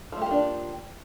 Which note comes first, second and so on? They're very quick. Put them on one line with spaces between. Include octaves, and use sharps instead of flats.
F3 A3 G4 A#3 D4